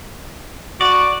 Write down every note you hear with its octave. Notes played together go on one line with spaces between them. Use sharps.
F#4 D5